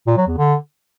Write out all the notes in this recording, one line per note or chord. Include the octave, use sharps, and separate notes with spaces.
A#2
F#3
E2
D3